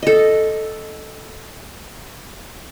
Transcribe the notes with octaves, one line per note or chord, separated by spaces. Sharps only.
A4 D#5